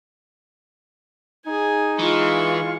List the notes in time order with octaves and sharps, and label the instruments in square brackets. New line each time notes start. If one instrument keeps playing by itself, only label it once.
[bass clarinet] D#4 [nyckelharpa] G#4 G#5
[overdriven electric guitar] E3 [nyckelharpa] G#3 C#6 [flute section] F4